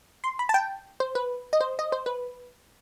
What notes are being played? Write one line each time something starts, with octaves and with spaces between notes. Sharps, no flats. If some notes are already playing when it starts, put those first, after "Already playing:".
C6
B5
A5
G5
C5
B4
D#5
C5
D#5
C5
B4